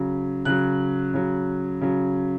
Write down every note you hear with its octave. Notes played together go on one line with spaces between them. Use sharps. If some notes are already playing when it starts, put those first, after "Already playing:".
Already playing: C#3 F#3
C#3 F#3 F#6
C#3 F#3
C#3 F#3